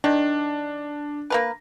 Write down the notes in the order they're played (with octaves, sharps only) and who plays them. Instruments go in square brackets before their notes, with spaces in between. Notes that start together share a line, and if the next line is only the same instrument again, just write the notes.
[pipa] D#3 [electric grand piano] D4
[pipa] A#3 A#4 B4